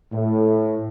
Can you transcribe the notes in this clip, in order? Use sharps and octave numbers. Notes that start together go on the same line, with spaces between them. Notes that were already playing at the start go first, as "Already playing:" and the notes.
A2